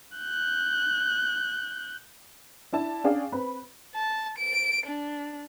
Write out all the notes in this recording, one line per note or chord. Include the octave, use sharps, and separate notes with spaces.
F#6 G6
D4 E4 A5
C#4 D4 G#4 F5 G5
C4 B4 B5
A5
D7
D4